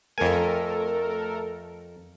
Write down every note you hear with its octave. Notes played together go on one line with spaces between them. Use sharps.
F2 A3 A4 A#4 G#5